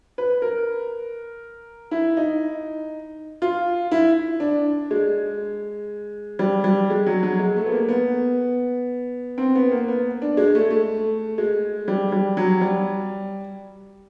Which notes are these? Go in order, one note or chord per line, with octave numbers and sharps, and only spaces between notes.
B4
A#4
E4
D#4
F4
E4
D4
G#3
G3
G3
G#3
F#3
F#3
G#3
A3
B3
A#3
B3
C4
B3
A#3
B3
D4
G#3
A3
A3
G#3
G3
G3
F#3
G3